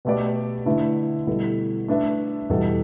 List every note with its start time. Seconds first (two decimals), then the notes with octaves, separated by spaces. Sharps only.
0.05 B2 A3 G4 B4 D5
0.66 D3 A3 E4 B4 E5
1.27 B2 G3 B3 E4 A4
1.88 A3 D4 B4 E5
2.50 E2 B2 G3 E4 A4